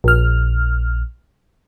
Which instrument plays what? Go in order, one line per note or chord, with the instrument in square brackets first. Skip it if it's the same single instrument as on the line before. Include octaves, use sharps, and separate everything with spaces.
[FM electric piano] A#1 F6